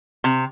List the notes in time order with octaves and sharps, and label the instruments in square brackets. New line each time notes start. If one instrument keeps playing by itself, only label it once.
[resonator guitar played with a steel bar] C3